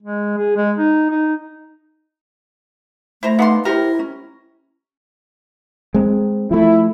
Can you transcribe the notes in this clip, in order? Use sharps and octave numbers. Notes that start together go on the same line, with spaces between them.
G#3
G#4
G#3
D#4
D#4
A3 E4 C5 A#5
B3 D4 D#4 F5 F#5 C6
C3 E4 G4 A#4 C5
C#4
G#3 C4
F3 A3 E4